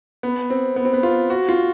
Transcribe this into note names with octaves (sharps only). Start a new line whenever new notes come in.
B3
C4
B3
C4
B3
F4
F#4
F4